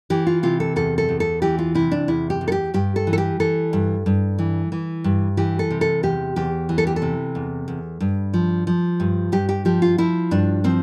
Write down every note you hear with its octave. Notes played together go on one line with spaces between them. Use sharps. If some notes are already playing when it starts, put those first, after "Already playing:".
E3 G4
F4
C3 F4
A4
E2 A4
A4
E2
A4
E3 G4
F4
C3 E4
D4
E2 E4
G4
E2
A4
G4
G2 G4
A4
E3
A4
G4
E3 A4
G2
G2
E3
E3
G2
E3 G4
A4
C3
A4
E2 G4
E2 G4
E3
A4
G4
A4
C3
E2
E2
G2
F3
F3
G2
G2 G4
G4
F3 G4
F4
F3 E4
G2 D4
F3 C4